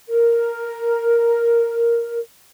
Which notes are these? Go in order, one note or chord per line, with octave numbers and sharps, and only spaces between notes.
A#4